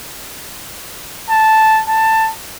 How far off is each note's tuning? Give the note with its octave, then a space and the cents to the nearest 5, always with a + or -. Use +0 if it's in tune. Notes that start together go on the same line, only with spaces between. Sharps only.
A5 -5
A5 +15